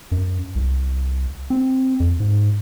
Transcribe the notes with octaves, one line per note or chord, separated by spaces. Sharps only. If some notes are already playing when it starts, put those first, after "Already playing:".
F#2
C2
C4
F2
G#2